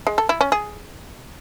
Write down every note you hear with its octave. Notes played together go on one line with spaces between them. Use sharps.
G#3
A4
E4
C#4
G#4